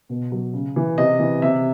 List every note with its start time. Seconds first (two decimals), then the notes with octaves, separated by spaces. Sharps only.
0.09 B2
0.32 F#3
0.54 C#3
0.76 E3
0.98 C3 D#5
1.20 E3
1.42 C3 E5